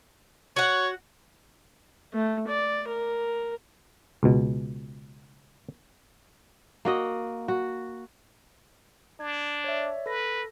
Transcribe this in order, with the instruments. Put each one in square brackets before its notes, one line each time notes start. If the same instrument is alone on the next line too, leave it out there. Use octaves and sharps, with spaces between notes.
[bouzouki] F#4 F#5 [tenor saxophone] C#5
[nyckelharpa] A3
D5
A#4
[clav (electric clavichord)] C#2 B2
[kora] A#3 F#4 D#5
F#4
[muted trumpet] D4 [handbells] G#6
[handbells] C#5 D5 E5
[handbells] A4 A#6 [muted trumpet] B4